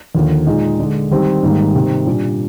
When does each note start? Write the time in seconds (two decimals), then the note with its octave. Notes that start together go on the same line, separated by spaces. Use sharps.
0.15 D#2 D3 F3 A#3
0.46 A#2 G#3 D#4 G#4
0.79 D3 G#3 D4
1.11 D#3 G3 C4 G4
1.43 G#2 D#3 G3 A#3
1.74 C3 D#3 G3 C4
2.07 A#2 G3 D4